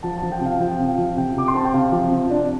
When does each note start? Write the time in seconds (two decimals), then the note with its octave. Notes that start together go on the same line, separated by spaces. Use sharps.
0.03 F3 A5
0.18 F3 A5
0.32 G5
0.41 C3
0.46 F5
0.60 F3 G5
0.79 C3
0.88 F5
0.98 F3
1.17 C3 G5
1.36 C3 D6
1.48 C6
1.54 C4 A5
1.65 G5
1.74 C3 F5
1.92 F3
2.11 C3
2.30 D4